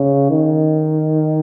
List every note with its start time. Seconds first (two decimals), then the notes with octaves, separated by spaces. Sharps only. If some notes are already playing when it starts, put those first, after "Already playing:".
Already playing: C#3
0.30 D#3